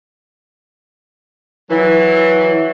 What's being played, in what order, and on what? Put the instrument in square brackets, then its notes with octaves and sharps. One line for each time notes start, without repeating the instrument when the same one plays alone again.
[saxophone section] E3 F#3